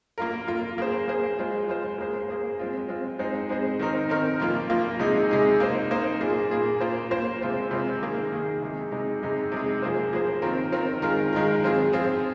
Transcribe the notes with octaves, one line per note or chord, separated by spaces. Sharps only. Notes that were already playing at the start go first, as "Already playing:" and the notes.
A#3 F4 A#4
A#3 F4 A#4
A#3 G#4 C5
A#3 G#4 C5
G#3 F4 C5
G#3 F4 C5
A#3 G#4 C5
A#3 G#4 C5
G#3 C4 F4
G#3 C4 F4
G#3 C4 D#4 G#4 C5
G#3 C4 D#4 G#4 C5
D#3 C4 D#4 A#4
D#3 C4 D#4 A#4
A#2 F3 A#3 F4
A#2 F3 A#3 F4
C3 G#3 D#4 G#4
C3 G#3 D#4 G#4
A#3 D#4 C5
A#3 D#4 C5
A#2 A#3 G#4
A#2 A#3 G#4
A#3 F4 C5
A#3 F4 C5
C3 G#3 F4 C5
C3 G#3 F4 C5
D#3 A#3 G#4
D#3 A#3 G#4
C3 G#3 D#4
C3 G#3 D#4
C3 G#3 D#4 G#4
C3 G#3 D#4 G#4
F3 A#3 G#4 C5
F3 A#3 G#4 C5
D#3 C4 F4 A#4
D#3 C4 F4 A#4
D#3 G#3 F4 A#4
D#3 G#3 F4 A#4
F3 C4 F4 G#4
F3 C4 F4 G#4